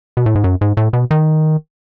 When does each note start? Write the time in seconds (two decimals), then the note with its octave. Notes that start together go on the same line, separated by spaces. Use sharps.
0.17 B2
0.26 A2
0.35 G#2
0.44 F#2
0.61 G#2
0.77 A2
0.93 B2
1.11 D#3